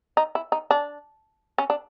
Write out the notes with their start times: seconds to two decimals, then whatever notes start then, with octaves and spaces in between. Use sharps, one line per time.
0.17 D#4
0.35 E4
0.52 D#4
0.71 D4
1.58 C#4
1.70 D4